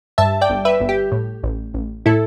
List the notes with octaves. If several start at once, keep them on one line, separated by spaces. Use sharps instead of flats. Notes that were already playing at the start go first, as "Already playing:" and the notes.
G2 E5 A5
D5 G5
G1
B4 E5
G1
G4
A2
A1
A1
A2 E4 A4